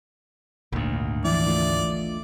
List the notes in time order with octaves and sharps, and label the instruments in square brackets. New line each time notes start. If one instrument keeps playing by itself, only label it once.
[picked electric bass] G#1 D2 [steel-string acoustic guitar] A#2
[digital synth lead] E3 [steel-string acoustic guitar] F3 E4 [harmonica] D5
[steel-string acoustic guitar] A3 F4 D#5